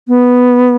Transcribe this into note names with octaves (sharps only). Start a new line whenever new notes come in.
B3